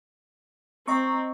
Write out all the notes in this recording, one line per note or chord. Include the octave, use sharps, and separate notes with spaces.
C4 D#5 A#5 C#6